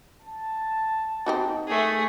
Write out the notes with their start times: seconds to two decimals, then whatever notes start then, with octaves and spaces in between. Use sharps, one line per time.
0.21 A5
1.26 C4 D#4 F#4
1.68 A3 G#4